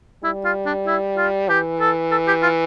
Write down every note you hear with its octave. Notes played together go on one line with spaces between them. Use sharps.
G3 E4
F4
D4
E4
F4
E3 G4
A4
A4
G4
F4